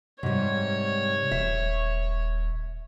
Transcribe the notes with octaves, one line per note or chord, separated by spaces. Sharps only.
G#2 C3 G3 C#5
D#1 E5